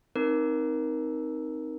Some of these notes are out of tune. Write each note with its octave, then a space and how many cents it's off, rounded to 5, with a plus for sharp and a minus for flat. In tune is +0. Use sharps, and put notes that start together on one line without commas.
C4 +0 D#4 +0 A#4 +15